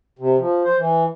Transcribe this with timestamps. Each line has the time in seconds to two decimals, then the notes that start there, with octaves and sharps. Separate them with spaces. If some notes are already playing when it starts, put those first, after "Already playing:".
0.19 C3
0.38 F3
0.64 C5
0.78 E3